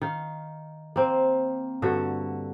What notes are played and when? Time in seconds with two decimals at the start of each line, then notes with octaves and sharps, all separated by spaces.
0.02 D#3 F5
0.96 A#3 C4
1.82 G2 D3 F#4 E5